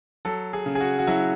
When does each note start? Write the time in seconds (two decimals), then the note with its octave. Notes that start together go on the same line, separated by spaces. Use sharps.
0.25 F#3 A4
0.53 G#4
0.66 C#3
0.75 G#4
0.80 F#4
0.99 F#4
1.07 F#3 E4